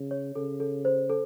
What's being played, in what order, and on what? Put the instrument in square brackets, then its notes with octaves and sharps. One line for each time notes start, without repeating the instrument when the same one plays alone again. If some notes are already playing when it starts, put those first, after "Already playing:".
Already playing: [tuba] C#3
[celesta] C#5
[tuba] C#3 [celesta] A4
[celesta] A4
C5
A4